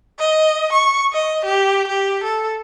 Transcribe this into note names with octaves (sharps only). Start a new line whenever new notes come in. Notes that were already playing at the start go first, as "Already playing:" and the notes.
D#5
C#6
D#5
G4
G4
A4